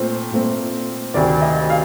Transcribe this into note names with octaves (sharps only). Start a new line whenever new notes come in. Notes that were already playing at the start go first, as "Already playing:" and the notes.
Already playing: A#2 A3 C4 C5
A#2 A3 C4
D2 C3 D#3 D5
D#5
F5